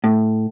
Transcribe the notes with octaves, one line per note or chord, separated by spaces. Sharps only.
A2